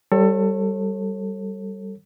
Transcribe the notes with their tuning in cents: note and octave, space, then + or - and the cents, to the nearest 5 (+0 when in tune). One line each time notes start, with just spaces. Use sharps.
G3 -15 A4 +20 C#5 -40